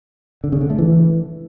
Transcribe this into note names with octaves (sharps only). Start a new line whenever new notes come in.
D3
C#3
D3
A3
E3